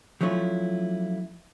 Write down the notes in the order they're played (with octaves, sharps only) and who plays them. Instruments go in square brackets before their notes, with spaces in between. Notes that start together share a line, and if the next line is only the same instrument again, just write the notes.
[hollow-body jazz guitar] F3 F#3 A3 C#4 E4 F4